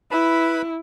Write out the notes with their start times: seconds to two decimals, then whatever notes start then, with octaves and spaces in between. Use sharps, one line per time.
0.11 E4 B4 B5